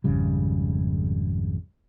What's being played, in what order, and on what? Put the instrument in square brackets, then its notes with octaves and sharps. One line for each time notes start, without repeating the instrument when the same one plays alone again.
[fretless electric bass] G#1 F2 C#3 G3